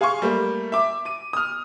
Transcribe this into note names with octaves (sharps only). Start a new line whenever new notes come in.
G#4 F5 G#5 C6 C#6
G3 A3 A#3
E5 D6
D6 D#7
D#6 F6